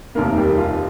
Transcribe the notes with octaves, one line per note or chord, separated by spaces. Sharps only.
F1 D#2 D#3 A#3 A#4
G3 G4
F4